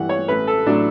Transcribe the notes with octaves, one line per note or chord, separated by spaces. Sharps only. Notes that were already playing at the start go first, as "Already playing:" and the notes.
Already playing: G2 E3 G3 F#5
C#5
A1 B4
A4
A2 F#3 D4